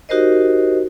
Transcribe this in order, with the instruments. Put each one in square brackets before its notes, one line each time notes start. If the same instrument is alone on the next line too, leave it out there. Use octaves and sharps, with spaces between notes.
[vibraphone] D#4 F#4 G4 A#4 C5 D#5